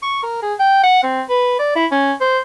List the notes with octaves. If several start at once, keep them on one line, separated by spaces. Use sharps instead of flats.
C#6
A#4
G#4
G5
F#5
C4
B4
D5
E4
C#4
C5